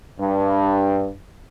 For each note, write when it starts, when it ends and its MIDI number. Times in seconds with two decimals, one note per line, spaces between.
0.20 1.10 43